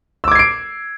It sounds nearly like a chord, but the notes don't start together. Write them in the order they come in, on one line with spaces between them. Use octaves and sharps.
E6 D6 G#6 C7 D7